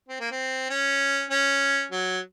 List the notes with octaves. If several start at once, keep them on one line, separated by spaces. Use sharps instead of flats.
C4
A#3
C4
C#4
C#4
F#3